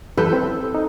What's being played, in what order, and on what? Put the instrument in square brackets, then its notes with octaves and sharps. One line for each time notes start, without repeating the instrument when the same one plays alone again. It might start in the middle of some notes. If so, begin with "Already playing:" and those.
[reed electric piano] E3 B4 G6 [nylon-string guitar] A4
[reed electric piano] C4
D#4